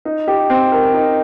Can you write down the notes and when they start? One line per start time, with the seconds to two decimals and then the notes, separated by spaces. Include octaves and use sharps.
0.05 D#4
0.28 G4
0.50 C4
0.72 A#4
0.94 D#4